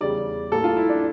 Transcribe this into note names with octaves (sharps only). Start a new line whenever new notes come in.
E2 C#3 G3 D5
A2 G3 A#3 A4
F4
E4
D4